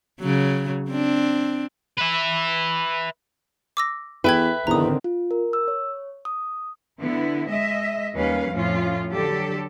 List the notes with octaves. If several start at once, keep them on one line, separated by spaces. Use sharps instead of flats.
C#3 F#3
C4 D4
B4 E5
D6 E6 A#6
E2 A4 B4 E5 G5 G#6
E2 D3 D#3 C4 A#5 D#6
F4
A#4
E6
C#5
D#6
D3 B3 E4
G#3 D#5 E5
D#2 D#3 G3 C#4 B4 F5
F2 A2 F3 C#4 F4
D3 F#3 G4 A4